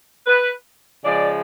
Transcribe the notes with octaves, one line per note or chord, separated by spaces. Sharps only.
B4
C#3 F3 G#3 D5